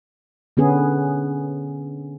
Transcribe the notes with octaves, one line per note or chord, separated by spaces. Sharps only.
D3 B3 C#4 G#4